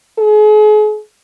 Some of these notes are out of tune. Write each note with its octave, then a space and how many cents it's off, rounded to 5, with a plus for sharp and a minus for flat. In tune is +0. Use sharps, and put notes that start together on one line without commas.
G#4 +40